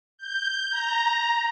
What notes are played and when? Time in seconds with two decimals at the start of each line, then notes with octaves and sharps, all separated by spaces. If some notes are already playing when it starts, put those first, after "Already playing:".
0.18 G6
0.71 A#5